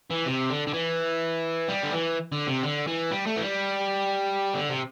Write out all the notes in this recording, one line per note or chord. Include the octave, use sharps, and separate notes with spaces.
E3
C3
D3
D3
E3
G3
D3
E3
D3
C3
D3
E3
G3
A3
E3
G3
D3
C3